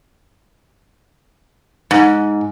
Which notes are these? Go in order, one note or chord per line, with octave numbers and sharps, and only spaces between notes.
G#2